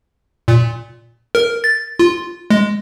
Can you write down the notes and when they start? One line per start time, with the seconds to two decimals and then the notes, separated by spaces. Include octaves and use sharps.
0.48 A#2
1.35 A#4
1.64 A6
1.99 F4
2.50 G#3